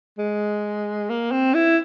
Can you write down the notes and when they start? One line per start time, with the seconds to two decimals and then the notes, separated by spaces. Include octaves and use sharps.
0.18 G#3
1.09 A#3
1.32 C4
1.54 E4